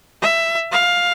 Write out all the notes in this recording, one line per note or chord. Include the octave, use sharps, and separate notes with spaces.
E5
F5